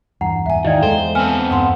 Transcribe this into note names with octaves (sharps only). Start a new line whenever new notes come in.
E2 G2 F#5 A#5
E2 G#2 E5 G#5
D#3 E4 D5 D#5 F5 G5
E2 G#3 A4 C5 E5 A#5
B3 C4 A4 G#5 F6
E2 G2 F#5 B5 C6